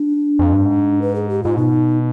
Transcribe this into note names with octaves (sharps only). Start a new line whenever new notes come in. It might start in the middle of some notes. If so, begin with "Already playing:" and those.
Already playing: D4
F2
G2
G#2
B4
G#4
G4
G#2 F4
B2 D#4